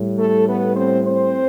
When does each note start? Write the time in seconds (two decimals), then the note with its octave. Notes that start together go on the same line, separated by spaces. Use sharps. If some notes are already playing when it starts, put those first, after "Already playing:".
Already playing: A2 G3
0.18 A3 A4
0.47 B3 B4
0.76 C4 C5
1.05 C4 C5